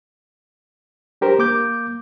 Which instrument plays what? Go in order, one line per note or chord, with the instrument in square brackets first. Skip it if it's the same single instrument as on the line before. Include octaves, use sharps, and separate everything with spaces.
[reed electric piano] D4 G4 A#4 C5
A#3 D6 G6